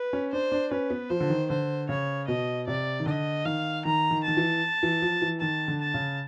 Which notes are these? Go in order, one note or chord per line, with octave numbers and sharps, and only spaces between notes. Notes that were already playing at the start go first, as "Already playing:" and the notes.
Already playing: B4
C#4
D4 C5
D4
C#4 B4
B3
F3 C5
D3
D#3
D3 C5
C#3 C#5
B2 D#5
C3 D5
D#3
D3 D#5
D#3 F5
D#3 A#5
D#3
D#3 A5
E3
E3
F3
E3
D#3 A5
D3
A5
C#3